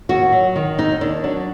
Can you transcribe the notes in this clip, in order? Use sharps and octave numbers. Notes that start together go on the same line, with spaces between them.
D#2 F#4
F#3
D#3
D#2 D#4
D#2 D4
F#3 D4